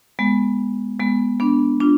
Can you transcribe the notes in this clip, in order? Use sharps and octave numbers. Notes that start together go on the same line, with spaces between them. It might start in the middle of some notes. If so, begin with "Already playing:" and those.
G#3 B3
G#3 B3
B3 D4
D4 F4